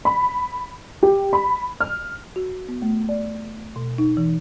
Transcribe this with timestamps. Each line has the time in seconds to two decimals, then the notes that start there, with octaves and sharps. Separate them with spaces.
0.05 B5
1.03 G4
1.33 B5
1.80 F6
2.36 F#4
2.68 B3
2.82 A3
3.09 D5
3.76 B2
3.98 D#4
4.17 E3